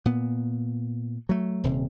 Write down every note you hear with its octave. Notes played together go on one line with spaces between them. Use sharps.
A#2 B3
F#3 A3
D#1 C3